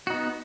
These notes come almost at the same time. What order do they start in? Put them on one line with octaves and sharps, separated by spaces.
F#4 D#4 B3